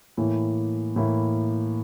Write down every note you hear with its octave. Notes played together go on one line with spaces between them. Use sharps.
A2 E3 A#3 E4
A2 E3 A#3 E4